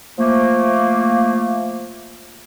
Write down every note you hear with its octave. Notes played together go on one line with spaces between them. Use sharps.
F3 A3 A#3